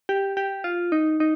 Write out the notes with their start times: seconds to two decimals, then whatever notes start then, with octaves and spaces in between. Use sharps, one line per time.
0.09 G4
0.37 G4
0.64 F4
0.92 D#4
1.20 D#4